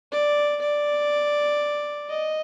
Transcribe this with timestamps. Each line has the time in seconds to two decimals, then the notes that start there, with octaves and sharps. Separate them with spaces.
0.12 D5
0.62 D5
2.10 D#5